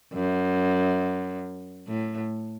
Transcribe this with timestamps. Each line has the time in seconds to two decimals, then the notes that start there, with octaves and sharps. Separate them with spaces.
0.13 F#2
1.88 A2